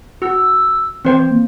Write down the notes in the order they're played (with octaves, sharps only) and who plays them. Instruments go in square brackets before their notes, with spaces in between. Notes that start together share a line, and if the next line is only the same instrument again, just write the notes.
[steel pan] F#4 [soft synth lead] E6
[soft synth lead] E3 [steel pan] C4 C5 G5
[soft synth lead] A#3